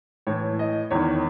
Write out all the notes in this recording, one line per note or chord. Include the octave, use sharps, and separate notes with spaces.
A2 E3 C#5
D#5
E2 D#3 C#5